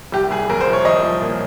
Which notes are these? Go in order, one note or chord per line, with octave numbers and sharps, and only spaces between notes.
C2 G4
C2 G#4
C2 A#4
C5
F3
C#5
C2 D#5
F3
A#2